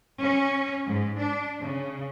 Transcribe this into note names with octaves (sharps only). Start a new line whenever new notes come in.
C#4
G#2
D4
C#3